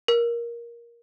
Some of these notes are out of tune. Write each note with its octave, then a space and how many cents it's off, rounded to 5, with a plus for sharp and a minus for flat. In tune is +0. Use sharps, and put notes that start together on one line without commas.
A#4 +15